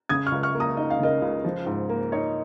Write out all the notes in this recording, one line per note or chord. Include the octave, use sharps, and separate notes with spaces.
C#3 D#6 G#6
C#6 F6
C#2
C#6 F6
A#3
A#5 D#6
D#4 D#5
F5
C#3 A#4 D#5
C#2
F3
G#2
A#3
D#4 C#5